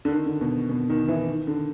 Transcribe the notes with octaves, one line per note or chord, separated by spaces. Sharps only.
D3
D#3
D3
B2
B2
D#3
E3
D#3
D3